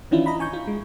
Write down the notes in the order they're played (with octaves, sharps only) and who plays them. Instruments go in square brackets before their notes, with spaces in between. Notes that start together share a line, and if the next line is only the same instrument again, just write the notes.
[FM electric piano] D#3 E3 C#4 D4 E4 F4
D#5 A#5 B5
G#5 C#6 G6
F4
G#3